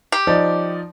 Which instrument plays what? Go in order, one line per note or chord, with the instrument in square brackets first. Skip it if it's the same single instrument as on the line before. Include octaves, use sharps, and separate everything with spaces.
[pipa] G4
[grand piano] F3 D#4 D5